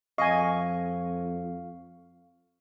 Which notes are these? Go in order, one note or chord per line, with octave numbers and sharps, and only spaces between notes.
F2 D#5 F5 G#5 C#6